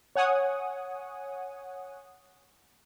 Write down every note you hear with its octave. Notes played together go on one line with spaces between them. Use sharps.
C#5 F#5 G#5 D#6